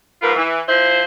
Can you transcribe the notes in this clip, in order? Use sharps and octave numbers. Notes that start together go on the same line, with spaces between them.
G#2 F3 F4 A#4 B4
E3
F3 E4 C5